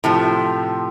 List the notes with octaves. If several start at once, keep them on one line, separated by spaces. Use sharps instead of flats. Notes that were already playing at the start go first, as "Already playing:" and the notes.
A2 C3 F3